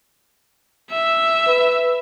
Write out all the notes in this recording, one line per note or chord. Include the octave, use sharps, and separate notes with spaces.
E5
B4